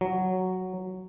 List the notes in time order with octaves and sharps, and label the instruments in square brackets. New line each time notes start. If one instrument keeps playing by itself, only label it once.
[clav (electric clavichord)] F#3